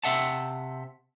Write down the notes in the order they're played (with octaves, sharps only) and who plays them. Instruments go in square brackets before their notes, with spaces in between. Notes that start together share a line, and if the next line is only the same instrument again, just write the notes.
[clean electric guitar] C3 E5 F#5 A5